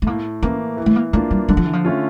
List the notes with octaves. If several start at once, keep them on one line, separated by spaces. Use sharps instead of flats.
A3
A2 A#3
E3 A#3 C#4
E3
A3
A#3
A3 A#3 D4 F4
G3
D3 G3
F3
E3
F3
A3 C#4 F4